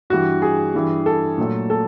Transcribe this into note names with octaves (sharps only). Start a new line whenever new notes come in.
G2 E3 G3 F#4
G#4
G2 E3 G3
A4
A#2 F#3 A3
A4